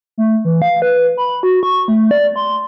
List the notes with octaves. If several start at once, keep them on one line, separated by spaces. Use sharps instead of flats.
A3
E3
F5
B4
B5
F#4
C#6
A3
D5
C6